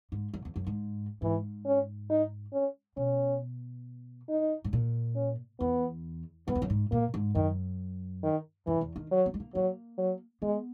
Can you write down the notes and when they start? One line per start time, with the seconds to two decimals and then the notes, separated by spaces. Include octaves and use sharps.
0.12 G#2
0.34 F#2
0.45 E2
0.56 F#2
0.67 G#2
1.22 G#2 E3
1.66 C#4
2.10 D#4
2.53 C#4
2.97 B2 C#4
4.29 D#4
4.64 G#2
4.73 A#2
5.16 C#4
5.59 E2 B3
6.48 F#2 B3
6.55 E2
6.62 F#2
6.70 G#2
6.91 A#2 A#3
7.14 G#2
7.35 F#2 D#3
8.23 D#3
8.67 F#2 E3
8.81 E2
8.96 D#3
9.11 F#3
9.26 B3
9.34 G#3
9.40 A#3
9.54 F#3 A#3
9.98 F#3
10.42 G#3 B3